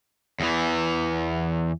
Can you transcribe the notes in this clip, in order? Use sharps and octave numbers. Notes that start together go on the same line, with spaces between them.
E2 E3